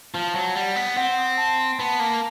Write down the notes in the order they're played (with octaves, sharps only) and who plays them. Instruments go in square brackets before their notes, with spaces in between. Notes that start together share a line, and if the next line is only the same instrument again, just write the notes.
[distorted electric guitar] F3 [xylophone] A5
[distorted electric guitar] F#3 [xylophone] A5
[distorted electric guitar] G3 [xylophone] F#5
[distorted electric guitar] B3 [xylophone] F#5
[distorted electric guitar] C4 [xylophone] F#5
[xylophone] D#6
A5
C6
[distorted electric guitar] B3 [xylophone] A5
[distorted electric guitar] A#3 [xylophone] A5